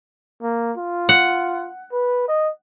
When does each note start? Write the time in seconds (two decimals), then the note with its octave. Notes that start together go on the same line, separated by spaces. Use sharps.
0.42 A#3
0.77 F4
1.09 F#5
1.92 B4
2.28 D#5